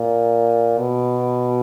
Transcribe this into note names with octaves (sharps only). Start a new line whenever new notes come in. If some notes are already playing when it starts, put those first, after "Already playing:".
Already playing: A#2
B2